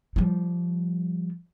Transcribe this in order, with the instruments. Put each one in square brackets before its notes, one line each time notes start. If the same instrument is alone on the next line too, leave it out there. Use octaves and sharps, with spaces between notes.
[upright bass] F3 G3